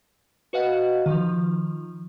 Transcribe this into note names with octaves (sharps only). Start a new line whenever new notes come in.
F#4 B4 D#5 F5 F#5
D#3 F3